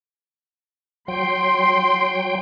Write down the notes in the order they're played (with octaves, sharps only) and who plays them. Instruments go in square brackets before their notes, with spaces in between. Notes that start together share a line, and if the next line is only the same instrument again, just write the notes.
[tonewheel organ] F#3 G5 [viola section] C6